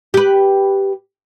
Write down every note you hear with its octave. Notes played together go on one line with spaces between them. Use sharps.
G4 B4